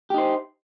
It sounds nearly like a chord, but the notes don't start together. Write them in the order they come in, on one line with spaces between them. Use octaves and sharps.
G4 D#4 C5